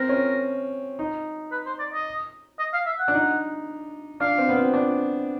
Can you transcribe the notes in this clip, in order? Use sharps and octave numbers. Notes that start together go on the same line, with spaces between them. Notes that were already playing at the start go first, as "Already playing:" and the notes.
Already playing: C4 A#4
C#4
D#4
B4
C5
D5
D#5
D#5
F5
E5
F#5
D4
D#4
D4 F5
C4
B3
C4
D4